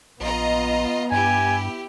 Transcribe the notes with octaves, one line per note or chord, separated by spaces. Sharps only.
A#1 B3 F4 D#5 A#5
G2 E4 G4 G#5